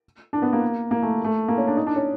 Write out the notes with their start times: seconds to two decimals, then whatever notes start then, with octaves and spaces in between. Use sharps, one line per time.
0.33 D4
0.42 B3
0.53 A#3
0.91 A#3
1.03 A3
1.24 A3
1.48 A#3
1.58 C#4
1.67 D4
1.77 D#4
1.87 D4
1.96 C#4